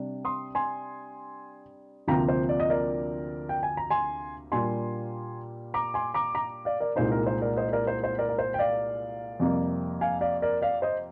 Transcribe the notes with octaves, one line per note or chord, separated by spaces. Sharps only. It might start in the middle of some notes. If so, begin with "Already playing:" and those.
Already playing: C3 G3 D4
C6 D#6
G#5 C6
D2 C3 F3 A#3 G5 A#5
C5
D5
D#5
A#4 D5
G5
G#5
A#5
G#5 C6
A#2 G3 A#3 D4 G#5 C6
A#5 D6
G#5 C6
A#5 D6
A#5 D6
D5 F5
A#4 D5
C2 A#2 G#3 D#4 C5
A#4
C5
A#4 D5
C5 D#5
A#4 D5
C5
C5
A#4 D5
A#4
C5
G5
D5 F5
F2 C3 G3 A#3
F5 G#5
D5 F5
A#4 D5
D5 F5
C5 D#5